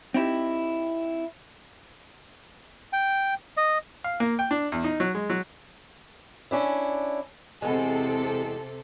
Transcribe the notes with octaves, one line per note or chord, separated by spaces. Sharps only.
C4 D#4 E4 G4
G5
D#5
F5
A#3
G5
D4
E2
D#4
F#3
G#3
F#3
C#4 D4 E4
E2 C3 G#3 A4